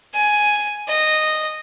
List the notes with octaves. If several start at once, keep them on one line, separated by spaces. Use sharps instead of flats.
G#5
D#5